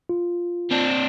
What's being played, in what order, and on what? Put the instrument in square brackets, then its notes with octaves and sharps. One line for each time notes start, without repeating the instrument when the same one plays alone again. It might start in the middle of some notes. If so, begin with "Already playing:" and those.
[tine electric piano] F4
[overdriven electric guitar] C4 D4